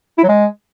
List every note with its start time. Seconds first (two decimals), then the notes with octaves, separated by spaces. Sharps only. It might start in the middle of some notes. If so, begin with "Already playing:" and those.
0.18 E4
0.24 F#3
0.29 G#3